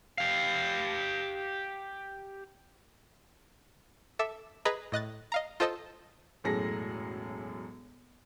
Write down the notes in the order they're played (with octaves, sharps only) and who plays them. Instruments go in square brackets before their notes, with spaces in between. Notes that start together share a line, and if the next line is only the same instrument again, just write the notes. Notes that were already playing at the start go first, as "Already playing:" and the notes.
[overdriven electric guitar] G4 F5
[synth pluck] A4 E5 D6 E6
G#4 B4 D#5 G#5 A#5
A2 D#5 F#6 A6
D#5 F5 A#5
F4 A4 C5 D#5 A5 E6
[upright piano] E1 F#2 A2 G#4 A4 A#6